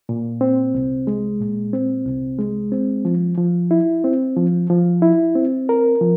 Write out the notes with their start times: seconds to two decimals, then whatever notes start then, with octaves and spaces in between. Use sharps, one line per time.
0.09 A#2
0.41 C4
0.75 C2
1.07 G#3
1.41 A#2
1.73 C4
2.06 C2
2.39 G#3
2.72 C4
3.05 F3
3.38 F3
3.71 E4
4.04 C4
4.37 F3
4.70 F3
5.02 E4
5.35 C4
5.69 A#4
6.01 F3